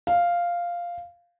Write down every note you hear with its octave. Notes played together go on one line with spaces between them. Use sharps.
F5